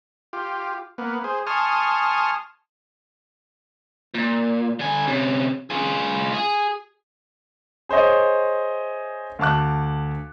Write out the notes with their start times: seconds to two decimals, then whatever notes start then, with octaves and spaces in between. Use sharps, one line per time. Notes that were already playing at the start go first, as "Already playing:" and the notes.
0.33 F4 G4
0.98 A#3 B3
1.24 G#4 C5
1.47 G#5 A5 C6 C#6 D#6 F6
4.14 A#2
4.79 D3 G#5
5.07 C3 C#4
5.70 F4 G#4
6.33 G#4
7.89 G#4 C5 C#5 D#5 E5
9.39 D2 F5 A5 D6 F#6